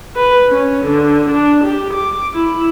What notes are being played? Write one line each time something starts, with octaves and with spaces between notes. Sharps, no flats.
B4
C#4
D3
D4
G4
D6
E4